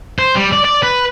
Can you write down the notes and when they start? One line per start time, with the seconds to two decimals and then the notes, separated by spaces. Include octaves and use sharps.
0.19 C5
0.35 G3
0.52 D5
0.65 D5
0.83 B4